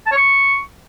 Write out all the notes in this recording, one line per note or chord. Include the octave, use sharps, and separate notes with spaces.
A5
C#5
C#6